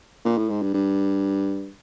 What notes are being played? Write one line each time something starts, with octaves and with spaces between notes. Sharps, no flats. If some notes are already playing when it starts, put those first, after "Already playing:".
A#2
A2
G#2
G2
G2